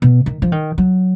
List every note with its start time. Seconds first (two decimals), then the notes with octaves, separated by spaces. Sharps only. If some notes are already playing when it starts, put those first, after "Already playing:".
0.02 B2
0.26 D#3
0.42 F3
0.52 D#3
0.78 F#3